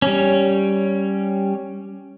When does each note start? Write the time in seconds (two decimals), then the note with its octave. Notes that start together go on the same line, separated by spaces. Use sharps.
0.02 G3 C#4